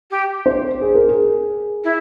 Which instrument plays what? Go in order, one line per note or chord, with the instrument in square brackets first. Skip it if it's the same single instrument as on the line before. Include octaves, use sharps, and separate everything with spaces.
[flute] G4
[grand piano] C5
G#4
A#4
G#4
[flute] E4